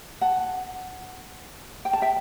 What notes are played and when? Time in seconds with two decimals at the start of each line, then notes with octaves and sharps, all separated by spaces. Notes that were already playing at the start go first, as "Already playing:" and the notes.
0.21 F#5 A5
1.85 G5
1.93 A5
2.02 E5 G5